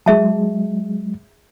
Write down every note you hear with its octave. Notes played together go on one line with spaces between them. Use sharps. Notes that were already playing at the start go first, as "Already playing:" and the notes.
F#3 G#3 G#4 E5 A5